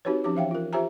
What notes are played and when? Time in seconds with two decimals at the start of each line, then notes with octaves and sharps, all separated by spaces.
0.05 C4 D#4 F#4 G4 B4 C#5
0.24 F3 C#4 D#4 G4 D6
0.35 E3 E5 F5 G5
0.51 F4 A#4
0.73 F4 G4 C5 E5 G#5 A#5